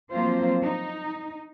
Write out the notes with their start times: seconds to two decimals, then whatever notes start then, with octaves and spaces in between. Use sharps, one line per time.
0.10 F3 F#3 A#3 C4 F4 C5
0.63 D#4